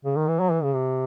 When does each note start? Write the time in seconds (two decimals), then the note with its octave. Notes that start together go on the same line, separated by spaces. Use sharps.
0.05 C#3
0.16 D#3
0.28 E3
0.40 F#3
0.52 E3
0.63 C#3
0.75 C3